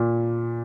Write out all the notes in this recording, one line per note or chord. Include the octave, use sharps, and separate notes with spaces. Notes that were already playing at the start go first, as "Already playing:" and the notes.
Already playing: A#2